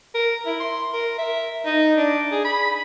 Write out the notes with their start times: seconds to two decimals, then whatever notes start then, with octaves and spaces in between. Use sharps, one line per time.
0.15 A#4
0.46 E4
0.60 C6
0.93 A#4
1.18 E5
1.66 D#4
1.97 D4
2.32 G#4
2.45 B5